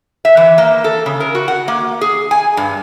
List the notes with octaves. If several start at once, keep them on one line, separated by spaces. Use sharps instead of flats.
E5
E3
A#3
A4
C#3
A#4
F#4
F#5
A#3
G#4
G#5
G2